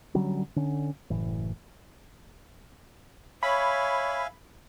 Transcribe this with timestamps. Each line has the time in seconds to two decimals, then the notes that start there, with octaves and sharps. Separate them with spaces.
0.15 D3 F#3 G3 C#4
0.56 D3 C#4
1.10 F#1 A2 E3
3.43 C#5 E5 F5 G#5 B5